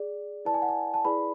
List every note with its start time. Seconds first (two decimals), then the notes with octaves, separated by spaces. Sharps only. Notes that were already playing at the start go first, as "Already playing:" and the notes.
Already playing: G#4 D5
0.45 E4 B4 D5 A5
0.54 G#5
0.62 F#5
0.69 G#5
0.94 A5
1.05 E4 G#4 B4 D5 B5